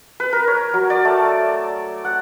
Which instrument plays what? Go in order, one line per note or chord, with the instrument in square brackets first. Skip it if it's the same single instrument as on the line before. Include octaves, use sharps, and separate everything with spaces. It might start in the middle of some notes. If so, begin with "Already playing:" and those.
[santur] B4
A#4
C#5
F#3
D5
A3
F#5